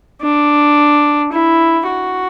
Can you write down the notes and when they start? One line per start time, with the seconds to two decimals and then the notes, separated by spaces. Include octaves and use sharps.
0.21 D4
1.32 E4
1.88 F#4